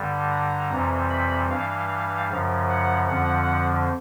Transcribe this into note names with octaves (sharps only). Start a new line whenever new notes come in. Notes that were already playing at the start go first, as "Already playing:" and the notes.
Already playing: G2 D3 G3
A#5
F2 C3 E3 G3
B5
G2 E3 G3 F5
F#2 C#3 F3
F#5
F2 D3 F3 F#5